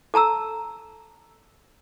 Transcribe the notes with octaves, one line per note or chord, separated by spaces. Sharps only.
A4 A5 A#5 E6